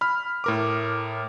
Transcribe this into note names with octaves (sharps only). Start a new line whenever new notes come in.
B5 F6
A2 A#4 D6